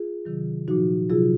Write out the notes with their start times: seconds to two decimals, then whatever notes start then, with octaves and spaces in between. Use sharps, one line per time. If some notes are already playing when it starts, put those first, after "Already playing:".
Already playing: F4 G#4
0.25 C3 D#3 F#3
0.68 A#2 F3 D#4 F#4
1.10 C3 F#3 F4 G#4